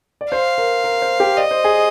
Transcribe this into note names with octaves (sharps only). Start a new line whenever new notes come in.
D5
C5 F5
A#4
A#4
C5
G4
D5 D#5
C5
G#4